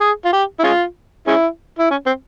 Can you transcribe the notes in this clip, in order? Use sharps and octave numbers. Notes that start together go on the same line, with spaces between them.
G#4
F4
G4
E4
G#3 C#4 F4
G#3 C#4 E4
E4
C#4
C4